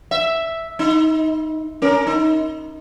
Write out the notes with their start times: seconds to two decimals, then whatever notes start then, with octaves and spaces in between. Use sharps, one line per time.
0.11 E5
0.79 D#4
1.82 C#4 A#4
2.07 D#4